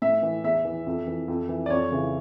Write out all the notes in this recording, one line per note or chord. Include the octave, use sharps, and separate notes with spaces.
A2 E5
E3
E2 E5
E3
F2
E3
F2
E3
D5
F2 C#5
C#3 E3